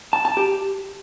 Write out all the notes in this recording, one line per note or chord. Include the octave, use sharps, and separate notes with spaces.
A5
A5
G4